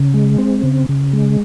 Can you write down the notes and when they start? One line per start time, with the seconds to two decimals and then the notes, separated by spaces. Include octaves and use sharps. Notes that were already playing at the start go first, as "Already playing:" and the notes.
Already playing: C#3
0.14 G#3
0.38 C4
0.63 C#3
0.89 C#3
1.13 G#3